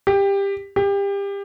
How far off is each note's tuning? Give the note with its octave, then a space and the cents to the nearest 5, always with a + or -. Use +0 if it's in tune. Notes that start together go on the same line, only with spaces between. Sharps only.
G4 +15
G4 +25